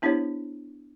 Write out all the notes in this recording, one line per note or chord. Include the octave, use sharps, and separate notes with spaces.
B3 D4 E4 G4 C5 C#5